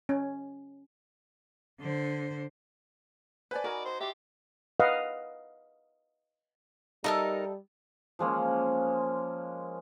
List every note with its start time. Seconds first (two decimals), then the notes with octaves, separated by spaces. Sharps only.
0.09 C#4
1.81 D3 C5
3.51 B4 C5 D5 F#5 G#5 A5
3.64 D#4 F#4 A#4 D5 D#5 G#5 B5
3.85 C5
4.01 G4 D5 E5 C6
4.80 B4 D#5 F5 F#5
7.04 G3 D#4 A4 A#4 D#5 E5 A5
8.19 F3 G#3 A#3 C#4